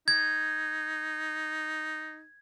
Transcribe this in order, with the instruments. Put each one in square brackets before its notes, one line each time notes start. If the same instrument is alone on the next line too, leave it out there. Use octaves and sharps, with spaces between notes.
[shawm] D#4 [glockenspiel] G#6